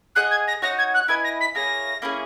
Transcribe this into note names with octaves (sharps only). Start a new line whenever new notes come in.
G#4 D#5 F#5 F#6
G#6
A#6
D#4 F#4 C#5 F#5 A#6
G#6
F#6
E4 B4 D#5 G#5 G#6
A#6
B6
A#3 E4 G#4 C#5 A#6
A#3 C#4 E4 G#4